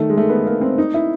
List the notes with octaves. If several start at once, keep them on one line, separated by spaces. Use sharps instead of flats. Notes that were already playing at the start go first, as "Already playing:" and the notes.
Already playing: D#3 A3
G#3
A3
B3
A#3
C4
D#4
E4